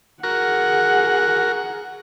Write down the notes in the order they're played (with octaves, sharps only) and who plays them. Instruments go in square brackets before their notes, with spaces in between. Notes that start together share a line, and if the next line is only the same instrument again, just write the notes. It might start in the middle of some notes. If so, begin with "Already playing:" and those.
[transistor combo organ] F#4 A#4 [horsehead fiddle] G#4 F#5